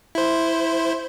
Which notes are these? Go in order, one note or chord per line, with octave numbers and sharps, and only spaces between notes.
E4 C5